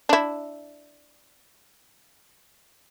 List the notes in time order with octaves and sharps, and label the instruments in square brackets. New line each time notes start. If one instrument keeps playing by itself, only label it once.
[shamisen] D4 E4